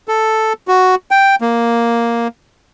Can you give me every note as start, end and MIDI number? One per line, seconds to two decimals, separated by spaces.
0.08 0.53 69
0.68 0.95 66
1.11 1.35 79
1.41 2.28 58